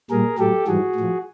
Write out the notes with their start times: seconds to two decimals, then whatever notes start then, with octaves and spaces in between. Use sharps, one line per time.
0.10 A#2 G3 G#4 A#4
0.39 A2 F#3 G4 A4
0.67 G#2 E3 G3 F#4 G#4
0.96 A2 F3